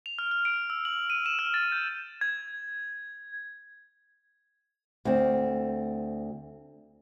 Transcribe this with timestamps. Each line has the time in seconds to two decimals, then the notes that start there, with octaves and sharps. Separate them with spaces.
0.06 F7
0.19 F6
0.31 F6
0.45 D7
0.70 E6
0.85 F#7
1.10 D#7
1.26 E7
1.39 F6
1.54 A6
1.72 G6
2.21 G#6
5.05 D2 C4